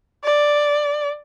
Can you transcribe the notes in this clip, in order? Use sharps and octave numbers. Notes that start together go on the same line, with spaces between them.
D5